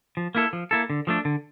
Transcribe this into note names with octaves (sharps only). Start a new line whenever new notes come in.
F3
A#3 E4 A4
F3
A#3 E4 A4
D3
F3 A3 D4
D3